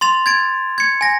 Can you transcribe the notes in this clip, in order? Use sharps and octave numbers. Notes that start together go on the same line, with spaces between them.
C6 A6 F7
G#6 A6 D7
G#6 C#7
G#5 A#6